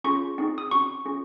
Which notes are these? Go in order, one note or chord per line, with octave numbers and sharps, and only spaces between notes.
C#4 F4 G#4 C#6
C4 D#4 G#4
D#6
C#4 F#4 C#6
C#4 F4 G#4